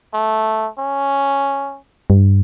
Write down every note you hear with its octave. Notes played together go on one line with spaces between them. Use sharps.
A3
C#4
G2